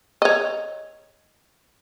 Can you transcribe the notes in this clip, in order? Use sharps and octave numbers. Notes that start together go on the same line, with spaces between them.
C#5 D#5